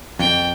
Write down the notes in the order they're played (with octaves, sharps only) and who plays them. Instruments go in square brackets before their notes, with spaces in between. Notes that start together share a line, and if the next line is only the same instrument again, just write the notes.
[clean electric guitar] F2 [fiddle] G5